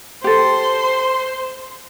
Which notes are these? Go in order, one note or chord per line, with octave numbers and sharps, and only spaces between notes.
G4 A4 C5 C6